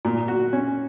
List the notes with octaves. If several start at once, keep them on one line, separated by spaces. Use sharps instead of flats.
A#2
F#4
C#4